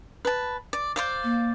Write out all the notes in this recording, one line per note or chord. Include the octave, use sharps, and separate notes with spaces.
B4 A5
D5
C5 D5 F5
A#3